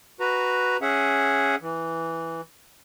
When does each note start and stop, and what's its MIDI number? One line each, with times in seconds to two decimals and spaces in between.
0.20 0.77 66
0.20 0.77 71
0.20 0.77 82
0.82 1.56 61
0.82 1.56 68
0.82 1.56 76
0.82 1.56 78
1.61 2.41 52